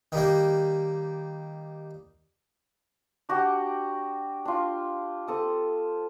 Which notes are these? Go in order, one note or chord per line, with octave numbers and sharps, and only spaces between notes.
D#3 G3 A#3
D4 F#4 G4 G5
D4 F4
C4 A4 D#6